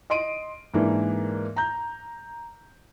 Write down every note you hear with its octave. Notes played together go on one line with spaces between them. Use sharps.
D#5 C6 D7 D#7
G#2 E3 A#3 D4
A#5 G6